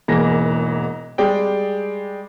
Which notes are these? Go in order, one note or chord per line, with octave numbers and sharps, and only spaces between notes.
E1 G#2 E3 A#3 A#6
G3 G#3 G#4 D5 G5